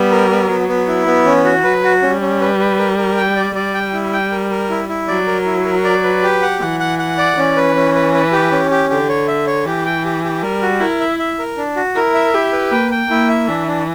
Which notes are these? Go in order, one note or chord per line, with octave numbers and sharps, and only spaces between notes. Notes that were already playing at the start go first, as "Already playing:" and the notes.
Already playing: G3 B3
A#4
B3
F#3 B3
B3
E4
B3
E3 C#4
F#4
F#3 B4
F#4
G3 C#4
C#4
B4
B4
A#4
A#4
G5
D5
G3 D5
G5
E4
G5
A#4
A#4
E4
E4
F#3 D5
A#4
E4
A#4
D5
B4
G4
F#5
E3 F#5
F#5
F#5
D5
E3 C#4
B4
C#4
B4
B4
G4
C#4
G4
D3 G4
C#5
E5
C#5
E3 G4
G5
G4
G4
G3 A#4
F#4
E4 A#4
E5
E5
A#4
D4
F#4
E4 A#4
E5
E4 G4
B4
A#3 G5
G5
A#3 E4
E5
E3 D4
D4